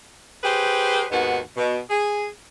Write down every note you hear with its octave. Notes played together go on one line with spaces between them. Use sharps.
G4 G#4 B4 C5
D#2 G#2 B3 F#4
B2
G#4